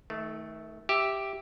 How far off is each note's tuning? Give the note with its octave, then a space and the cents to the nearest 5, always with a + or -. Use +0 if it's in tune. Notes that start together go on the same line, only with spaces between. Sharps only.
D#3 +30 A3 -10
G4 +0 E5 +0